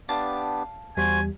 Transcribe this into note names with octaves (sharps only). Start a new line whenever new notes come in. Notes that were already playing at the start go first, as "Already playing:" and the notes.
B3 D4 G4 D5 F5 A5
E2 G3 F#4 C5 G#5